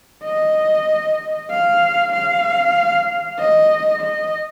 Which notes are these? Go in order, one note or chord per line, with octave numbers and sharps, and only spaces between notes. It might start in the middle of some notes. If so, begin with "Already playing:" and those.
D#5
F5
F5
D#5
D#5